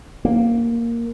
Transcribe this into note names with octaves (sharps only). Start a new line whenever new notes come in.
A#3